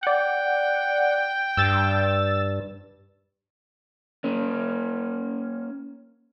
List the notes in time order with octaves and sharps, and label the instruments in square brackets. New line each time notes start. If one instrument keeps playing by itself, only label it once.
[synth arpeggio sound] D5 F#5 [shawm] G5
[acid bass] G2 [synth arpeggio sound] E6 A6
[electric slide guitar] A#3 C#4